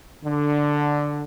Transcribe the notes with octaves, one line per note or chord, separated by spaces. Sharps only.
D3